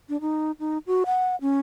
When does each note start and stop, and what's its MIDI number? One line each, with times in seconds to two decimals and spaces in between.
0.09 0.20 62
0.21 0.51 63
0.60 0.78 63
0.87 1.03 66
1.06 1.36 78
1.41 1.60 61